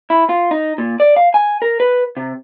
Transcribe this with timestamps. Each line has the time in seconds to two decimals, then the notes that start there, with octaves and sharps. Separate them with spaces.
0.10 E4
0.29 F4
0.51 D#4
0.78 A#2
1.00 D5
1.17 F5
1.34 G#5
1.62 A#4
1.80 B4
2.17 C3